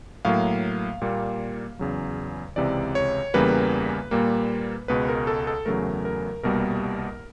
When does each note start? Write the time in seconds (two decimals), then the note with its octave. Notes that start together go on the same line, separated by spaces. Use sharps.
0.25 A2 F#3 A#3 F5
1.01 A#2 G3 A#3
1.79 E2 C#3 F#3
2.56 C#2 C3 E3 D5
2.95 C#5
3.34 E2 C#3 E3 G3 A#3 B4
4.11 A#2 G3 A#3
4.88 C#2 B2 G#3 B4
5.08 A#4
5.27 A4
5.47 A4
5.66 E2 C#3 F#3 A3 A#4
6.05 A#4
6.43 C2 B2 G3 A#3 A#4